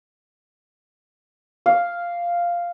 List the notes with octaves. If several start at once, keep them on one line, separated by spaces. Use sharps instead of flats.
F5